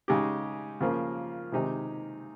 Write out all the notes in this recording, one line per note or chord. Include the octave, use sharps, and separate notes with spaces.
C#3 G#3 D#4 G4
C#3 F3 A#3
C3 D#3 G#3 D#4 G4